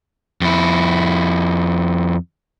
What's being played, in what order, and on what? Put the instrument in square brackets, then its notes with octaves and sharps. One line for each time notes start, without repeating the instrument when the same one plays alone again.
[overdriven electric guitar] F2 E4